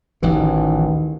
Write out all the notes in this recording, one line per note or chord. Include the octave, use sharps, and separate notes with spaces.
A1 D2 D#3 E3